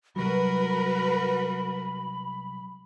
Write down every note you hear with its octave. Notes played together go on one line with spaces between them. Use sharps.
C2 F#3 F#4 A#4 B4 B5